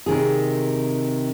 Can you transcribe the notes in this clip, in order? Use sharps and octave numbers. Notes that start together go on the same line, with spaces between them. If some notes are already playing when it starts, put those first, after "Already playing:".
C3 D#3 G#4